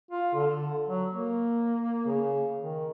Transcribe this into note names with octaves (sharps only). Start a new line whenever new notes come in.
F4
D3
F#3
A#3
C#3
D#3